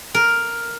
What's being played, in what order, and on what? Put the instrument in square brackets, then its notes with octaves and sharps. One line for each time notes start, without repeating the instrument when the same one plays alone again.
[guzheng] A#4